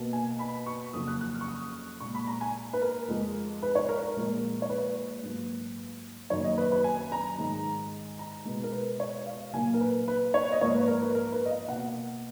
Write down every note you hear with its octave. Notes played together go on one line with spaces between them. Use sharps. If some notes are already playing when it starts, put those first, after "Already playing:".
Already playing: B2 A#3
G#5
B5
C#6
F2 C#3 F#3 A#3 D#6
F#6
F#6
F6
C#6
D#6
A#2 G#3 C#6
B5
A#5
G#5
B4
A#4
F2 F3 G#3
B4
C#5
A#4
A#4
A#2 F3 G#3
C#5
B4
G#2 F#3 A#3
F#2 D#3 A#3 C#5
D#5
B4
B4
G#5
A#5
G#2 D#3 G#3
A#5
B2 G#3
A#4
B4
C#5
F5
A#2 F#3 A#3 G#5
A#4
B4
B4
C#5
D#5
G#2 F3 A#3 C#5
B4
A#4
B4
A#4
B4
D#5
F5
B2 A#3 F#5